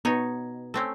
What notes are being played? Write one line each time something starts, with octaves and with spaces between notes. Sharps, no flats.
B2 B3 D#4 C#5
A3 C4 C#4